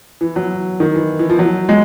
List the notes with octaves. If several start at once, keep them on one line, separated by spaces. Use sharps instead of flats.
E3
F#3
D#3
E3
E3
F3
F#3
G#3